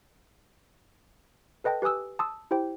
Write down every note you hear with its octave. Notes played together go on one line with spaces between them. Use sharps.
A4 B4 D#5 G5 A5
G4 B4 G#5 D#6 E6
A5 C6 D#6 E6
E4 G4 C5 G5